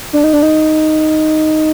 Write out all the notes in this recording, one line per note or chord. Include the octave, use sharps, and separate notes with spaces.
D4
D#4
D4
D#4